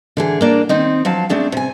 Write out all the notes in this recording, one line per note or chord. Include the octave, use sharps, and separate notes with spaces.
D3 E3 G#4
A#3 D4 F#4
D#3 C4 D#4
F3 F#3 F5 A5
A3 C4 D4 G#4
C3 G#5